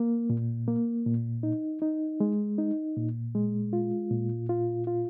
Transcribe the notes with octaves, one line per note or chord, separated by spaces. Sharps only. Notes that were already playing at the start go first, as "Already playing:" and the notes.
Already playing: A#3
A#2
A#3
A#2
D#4
D#4
G#3
D#4
A#2
G#3
F4
A#2
F4
F4